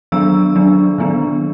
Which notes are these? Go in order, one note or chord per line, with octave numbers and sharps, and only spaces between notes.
D#3 F#3 B3 D4 E6
D#3 F#3 B3 D4
D#3 F#3 B3 D4